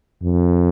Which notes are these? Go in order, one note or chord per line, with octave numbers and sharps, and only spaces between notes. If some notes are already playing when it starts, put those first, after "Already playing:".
F2